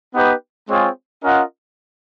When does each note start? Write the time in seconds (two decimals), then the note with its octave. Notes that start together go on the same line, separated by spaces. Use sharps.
0.14 B3 D#4 G4 B4
0.68 G#3 C4 F4 G#4 C#5
1.22 C#4 F4 A#4 D#5 F#5